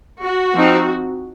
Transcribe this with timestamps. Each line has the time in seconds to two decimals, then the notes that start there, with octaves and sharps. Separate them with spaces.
0.23 F#4
0.54 F3 C4 D#4